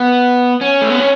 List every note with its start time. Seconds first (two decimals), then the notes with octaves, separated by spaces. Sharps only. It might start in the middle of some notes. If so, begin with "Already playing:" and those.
Already playing: B3
0.61 C#4
0.81 A3
0.90 B3
1.00 C#4